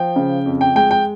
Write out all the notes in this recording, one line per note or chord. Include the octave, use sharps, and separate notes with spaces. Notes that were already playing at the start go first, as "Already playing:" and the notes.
Already playing: F3 G5
C#3
F2
G5
G#3 G5
G5